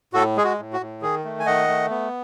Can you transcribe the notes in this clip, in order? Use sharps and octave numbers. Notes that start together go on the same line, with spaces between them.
A2 F#4 A4
G#3 G#4
F#4
A2
F#4
A2
D#3 G#4
A3
G#5
D#3 D#5 F#5
A3
B3